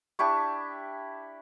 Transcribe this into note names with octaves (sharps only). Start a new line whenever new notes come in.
D4 E4 G4 C#6